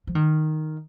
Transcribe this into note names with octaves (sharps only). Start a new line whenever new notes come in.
F3
D#3